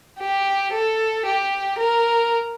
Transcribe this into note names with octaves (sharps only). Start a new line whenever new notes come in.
G4
A4
G4
A#4